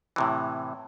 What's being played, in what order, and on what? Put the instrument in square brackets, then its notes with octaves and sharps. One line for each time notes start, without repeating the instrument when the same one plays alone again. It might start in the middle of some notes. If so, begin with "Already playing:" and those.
[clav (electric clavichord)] A2 C3 E3